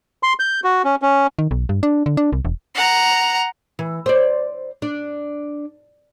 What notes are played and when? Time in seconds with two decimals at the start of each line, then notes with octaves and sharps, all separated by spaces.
0.23 C6
0.40 G6
0.64 F#4
0.84 C#4
1.02 C#4
1.39 D#3
1.51 B1
1.69 G2
1.83 D4
2.06 D3
2.17 D4
2.33 C2
2.45 E1
2.75 F#5 A#5
3.79 E3
4.06 C5 D5
4.82 D4